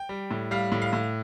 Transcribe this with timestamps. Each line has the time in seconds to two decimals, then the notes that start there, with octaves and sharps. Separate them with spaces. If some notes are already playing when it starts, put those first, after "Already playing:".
Already playing: G5
0.09 G3
0.31 A2
0.51 G3 F5
0.72 A2
0.82 F5
0.93 A2